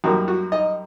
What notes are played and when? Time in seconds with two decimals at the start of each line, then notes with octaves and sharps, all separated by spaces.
0.04 F#2 D#3 G3 A#3 F#4
0.28 F#4
0.52 D#4 D#5